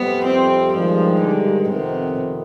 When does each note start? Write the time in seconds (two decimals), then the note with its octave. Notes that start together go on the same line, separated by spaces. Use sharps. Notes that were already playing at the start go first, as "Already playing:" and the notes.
Already playing: F2 C3 G3 B3
0.25 C4
0.73 G2 D#3 F3 G#3
1.21 D3
1.68 F2 C3 D#3 B3